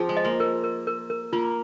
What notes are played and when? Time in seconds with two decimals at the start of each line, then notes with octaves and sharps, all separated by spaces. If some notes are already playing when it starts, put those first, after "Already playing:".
Already playing: F3 C4 G#4
0.09 G#3
0.17 D#5
0.25 A#3
0.40 A#4
0.64 A#4
0.87 A#4
1.10 A#4
1.33 A#3 F4